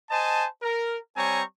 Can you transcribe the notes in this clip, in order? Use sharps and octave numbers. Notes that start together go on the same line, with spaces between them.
C5 D#5 G#5 A5
A#4
G3 C4 C#5 G#5 A#5 C#6